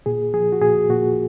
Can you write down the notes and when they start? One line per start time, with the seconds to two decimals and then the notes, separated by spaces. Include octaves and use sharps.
0.06 A#2 G#4
0.34 F3 G#4
0.52 F#4
0.62 A#2 G#4
0.89 A#2 F#4